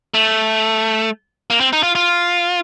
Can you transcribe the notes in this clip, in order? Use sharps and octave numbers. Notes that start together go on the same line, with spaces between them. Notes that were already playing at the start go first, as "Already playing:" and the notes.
A3
A#3
C4
D#4
F4
F4